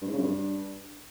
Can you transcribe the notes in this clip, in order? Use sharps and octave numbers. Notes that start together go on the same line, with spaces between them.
G2
G#2
C#3
F#2
G2